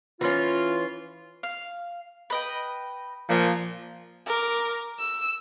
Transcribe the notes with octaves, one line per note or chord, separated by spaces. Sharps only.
E3 C#4 F4
F5
B4 D#5 G5
A#2 F3
A#4 D6
E6